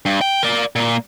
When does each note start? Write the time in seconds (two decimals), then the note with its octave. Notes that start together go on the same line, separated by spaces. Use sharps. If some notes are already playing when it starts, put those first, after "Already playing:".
0.06 G2
0.21 G5
0.43 A#4 D5
0.76 A#2 A#3